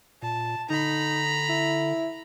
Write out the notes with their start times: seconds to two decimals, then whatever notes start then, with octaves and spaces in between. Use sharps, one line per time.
0.22 A#2 A5
0.70 D3 D#4 A#5 B5
1.49 E4